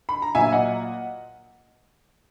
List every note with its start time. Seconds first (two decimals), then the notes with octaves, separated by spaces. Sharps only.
0.09 B5
0.22 A#5
0.35 A#2 F#3 A#3 E5 G#5
0.52 D#5 F#5